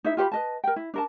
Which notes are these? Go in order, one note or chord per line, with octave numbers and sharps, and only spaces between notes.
D#4 E4 E5
F4 G4 C#5 B5
B4 D#5 A5
A#4 G5
E4
D4 A#4 A5